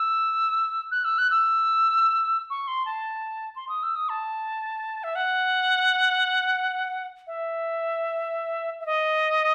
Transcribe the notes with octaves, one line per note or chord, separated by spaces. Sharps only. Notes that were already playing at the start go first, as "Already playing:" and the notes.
Already playing: E6
F#6
E6
F#6
E6
C#6
C6
A5
C6
D#6
E6
D#6
A5
E5
F#5
E5
E5
D#5